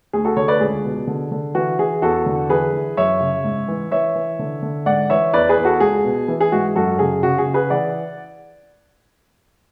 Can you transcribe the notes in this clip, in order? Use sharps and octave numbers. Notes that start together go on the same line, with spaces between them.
D2 G#4
F#4 A4
D3 A4 C#5
B4 D5
C#2 G#4
B2
D3
D3
E3 F#4
E3 G#4
E2 F#4 A4
D3
E3 G#4 B4
E3
F#2 C#5 E5
C#3
G#2
E3
E3 C#5 E5
E3
D3
D3
G#2 D5 F#5
E3 C#5 E5
E2 B4 D5
G#4 B4
E2
F#4 A4
C#2 G#4
B2
E3
G#4
G#2 F#4
F#2 F#4 A4
C#3 G#4
C#3 F#4
G#4
C#3
G#4 B4
E3 D5 F#5